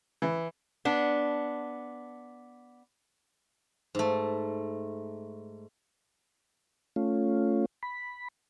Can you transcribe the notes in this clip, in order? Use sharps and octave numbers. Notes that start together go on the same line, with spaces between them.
E3
B3 D4
G#2 A3
A3 C#4 F4
B5